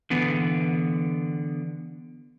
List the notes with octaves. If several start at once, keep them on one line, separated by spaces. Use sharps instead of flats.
D3 E3 B3